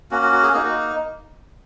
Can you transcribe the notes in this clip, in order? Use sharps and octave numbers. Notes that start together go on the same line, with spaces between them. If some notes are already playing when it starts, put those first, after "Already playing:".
A#3 C#4 F#4
F#4
F#4
G#4
A#3 D#4 F#4 G#4
F#4